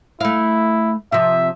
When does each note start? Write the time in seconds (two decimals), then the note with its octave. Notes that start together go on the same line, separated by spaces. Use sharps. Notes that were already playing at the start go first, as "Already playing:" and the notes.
0.21 A3 E4 F5
1.12 C3 F3 E5